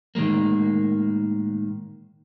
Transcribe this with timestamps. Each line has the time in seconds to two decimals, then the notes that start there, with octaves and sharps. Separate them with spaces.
0.15 A2 D#3 E3 G#3 A#3